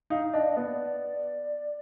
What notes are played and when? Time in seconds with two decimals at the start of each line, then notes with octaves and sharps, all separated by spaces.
0.10 D#4 F5
0.34 D4 D#5
0.51 D#5
0.57 B3 D5